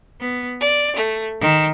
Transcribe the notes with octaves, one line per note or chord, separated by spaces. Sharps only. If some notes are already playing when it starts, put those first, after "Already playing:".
B3
D5
A3
D#3